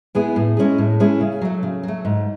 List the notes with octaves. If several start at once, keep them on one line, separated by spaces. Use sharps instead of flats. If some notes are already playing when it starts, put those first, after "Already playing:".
G#3 B3 E4 G#4
A2
G#3 C#4 E4 G#4
A2
G#3 C#4 E4 G#4
C#3
F#3 A3
C#3
F#3 A3
G#2